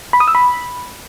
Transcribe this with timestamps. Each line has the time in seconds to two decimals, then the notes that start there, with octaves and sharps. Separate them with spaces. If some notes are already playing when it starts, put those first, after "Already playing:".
0.13 B5
0.20 D#6
0.28 E6
0.35 B5